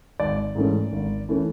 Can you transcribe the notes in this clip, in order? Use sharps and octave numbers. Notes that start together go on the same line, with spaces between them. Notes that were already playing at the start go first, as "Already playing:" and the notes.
G#1 D5
G#2 E3 A3 C#4
G#1
E3 A3 C#4